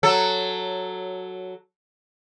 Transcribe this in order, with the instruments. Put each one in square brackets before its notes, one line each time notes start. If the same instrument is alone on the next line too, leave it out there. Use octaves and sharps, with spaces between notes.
[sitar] F#3 A4